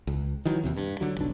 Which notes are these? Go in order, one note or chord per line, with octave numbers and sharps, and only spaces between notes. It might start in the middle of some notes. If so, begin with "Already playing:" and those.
C#2
D#3 E3 F#3
D#2 C3
G2
D3 F#3
F1 B1 D4